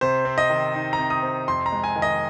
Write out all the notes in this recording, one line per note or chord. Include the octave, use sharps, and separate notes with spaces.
C3 C5
C4
D#5
D#3
D#4
A#5
C3
D#6
C4
F2 C6
A#5
G#3
G#5
D#3
D#5